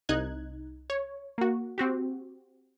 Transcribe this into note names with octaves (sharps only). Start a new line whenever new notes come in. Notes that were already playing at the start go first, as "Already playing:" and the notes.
C2 D#4 F#6 G#6
C#5
A#3 F#4
C4 F#4 G4